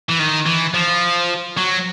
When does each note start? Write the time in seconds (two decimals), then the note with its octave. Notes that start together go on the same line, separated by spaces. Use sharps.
0.09 E3
0.19 D#3
0.46 E3
0.74 F3
1.57 F#3